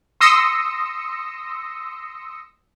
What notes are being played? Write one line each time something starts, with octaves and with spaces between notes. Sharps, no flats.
C6 D#6 E6 A#6 C#7